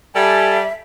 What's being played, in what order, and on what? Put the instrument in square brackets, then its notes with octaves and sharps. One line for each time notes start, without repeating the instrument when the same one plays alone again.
[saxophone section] G3 [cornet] A4 [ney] E5 [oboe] G#5